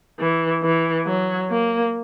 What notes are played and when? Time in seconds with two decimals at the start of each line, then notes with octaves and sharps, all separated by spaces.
0.19 E3
0.63 E3
1.06 F#3
1.50 A#3